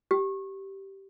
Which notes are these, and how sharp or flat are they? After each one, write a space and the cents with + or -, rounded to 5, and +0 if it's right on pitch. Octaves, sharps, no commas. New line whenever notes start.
G4 -10